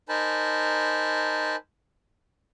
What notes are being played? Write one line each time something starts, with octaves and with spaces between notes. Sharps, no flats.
D#4 A#4 C5 G#5 A5 B5